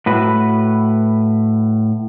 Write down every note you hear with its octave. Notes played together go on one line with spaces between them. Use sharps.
A2 F#4 B4